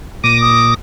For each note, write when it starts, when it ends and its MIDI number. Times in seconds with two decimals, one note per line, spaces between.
0.24 0.74 46
0.24 0.74 86
0.24 0.74 94
0.24 0.37 99
0.41 0.73 87